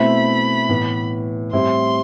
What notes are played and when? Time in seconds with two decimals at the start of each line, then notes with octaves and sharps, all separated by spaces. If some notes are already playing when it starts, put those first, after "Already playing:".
Already playing: B2 A3 C4 E4 B5
0.69 A2 E3 B3
1.53 A2 G3 C4 E4 C6